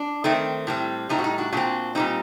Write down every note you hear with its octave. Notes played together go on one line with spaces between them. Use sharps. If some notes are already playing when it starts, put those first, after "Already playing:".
Already playing: D4
D#3 A3 C4
A2 G3 C4
A2 G3 C4 D#4
F#4
D#4
D4 F#4
A#2 G3 C4 D4 F#4
A#2 G3 C4 D#4